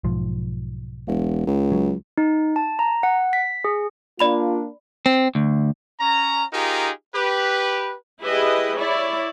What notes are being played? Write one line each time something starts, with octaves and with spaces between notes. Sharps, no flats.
B1 G#2 F3
E1
C#2
F#3
D#4
A5
A#5
F#5
B6
G#4
A#3 D4 F4 D5 B5 F7
C4
D2
C#4 A#5
D#4 F4 G4 G#4 A#4
G4 B4
E4 G4 G#4 B4 D#5
E4 C#5 D5